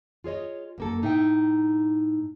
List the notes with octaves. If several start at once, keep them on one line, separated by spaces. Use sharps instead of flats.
F4 G#4 C#5 D#5
F#2 A#3 A4
A2 D#4 A4 E5 F5 G5